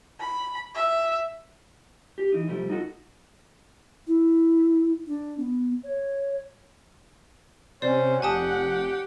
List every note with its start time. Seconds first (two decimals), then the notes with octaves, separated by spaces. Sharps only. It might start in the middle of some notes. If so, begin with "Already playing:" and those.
0.20 B5
0.74 E5
2.18 G4
2.32 E3 D#4
2.48 C3 F3 G3 A3
2.70 D#4 F4 F#4 G#4 A4
4.07 E4
5.06 D4
5.38 B3
5.84 C#5
7.82 C3 C#4 C5 D5
8.22 F1 G4 F#5 G#5 A5 D#6